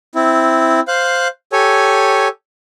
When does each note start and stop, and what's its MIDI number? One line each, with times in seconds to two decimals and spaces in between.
0.15 0.80 60
0.15 0.80 64
0.88 1.28 72
0.88 1.28 77
0.88 1.28 90
1.52 2.28 67
1.52 2.28 69
1.52 2.28 73
1.52 2.28 80